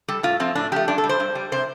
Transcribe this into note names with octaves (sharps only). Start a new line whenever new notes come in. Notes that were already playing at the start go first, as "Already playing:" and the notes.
G3 A4
A2 F4
F3 A3 C4
A2 D4
F3 A3 G4
G2 D4
A4
G3
C5
G2
G3
C3 C5